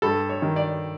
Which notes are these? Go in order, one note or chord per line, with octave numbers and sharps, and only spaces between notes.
G2 A4
C#5
D#3
D5